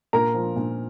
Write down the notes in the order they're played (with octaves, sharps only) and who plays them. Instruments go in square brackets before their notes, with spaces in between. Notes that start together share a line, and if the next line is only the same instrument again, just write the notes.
[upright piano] A#2 A#4 A#5
F3
A#2